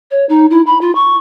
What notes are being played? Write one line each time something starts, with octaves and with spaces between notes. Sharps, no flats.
C#5
D#4
E4
B5
F4
C#6